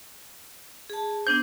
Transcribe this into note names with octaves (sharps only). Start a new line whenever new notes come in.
G#4 A5
B3 D4 C5 G6